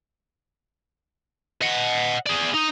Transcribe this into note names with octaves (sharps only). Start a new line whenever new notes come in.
D#5 F#5
G#4 D5
D#4